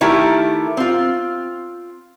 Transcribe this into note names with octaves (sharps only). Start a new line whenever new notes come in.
D#3 A3 E4 G4 A#4
C4 F4